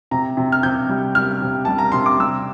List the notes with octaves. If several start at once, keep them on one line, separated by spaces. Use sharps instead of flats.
C3 A#5
C3
F6
C3 G6
G3
G3 F6
C3
G3 A5
A#5
C3 C6
D6
G3 E6